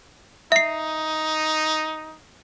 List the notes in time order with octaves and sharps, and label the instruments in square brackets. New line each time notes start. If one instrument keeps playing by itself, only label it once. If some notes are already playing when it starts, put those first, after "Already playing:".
[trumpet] D#4 [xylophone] E5 C7